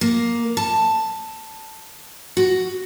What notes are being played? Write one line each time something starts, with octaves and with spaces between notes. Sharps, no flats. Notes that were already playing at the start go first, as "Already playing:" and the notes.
A#3
A5
F#4